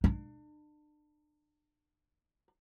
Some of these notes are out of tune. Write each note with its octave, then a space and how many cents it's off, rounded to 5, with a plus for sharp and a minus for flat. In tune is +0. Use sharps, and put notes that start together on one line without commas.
D4 +35